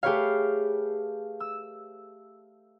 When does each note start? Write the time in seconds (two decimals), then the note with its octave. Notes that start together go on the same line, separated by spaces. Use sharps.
0.03 A3 G4 G#4 B4 C#5 F5
1.40 E6